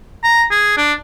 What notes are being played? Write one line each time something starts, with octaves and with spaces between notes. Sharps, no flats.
A#5
G#4
D4